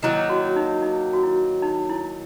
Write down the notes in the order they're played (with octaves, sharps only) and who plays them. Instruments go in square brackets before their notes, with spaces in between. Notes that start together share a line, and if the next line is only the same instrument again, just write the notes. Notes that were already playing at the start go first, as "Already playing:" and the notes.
[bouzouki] D#3 F#3 A#3 [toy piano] E4
[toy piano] F#4
D#4
D#4
F#4
E4
D#4
E4